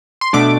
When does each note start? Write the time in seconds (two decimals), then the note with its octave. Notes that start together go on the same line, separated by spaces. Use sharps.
0.21 C6
0.33 B2 A3 D4 D6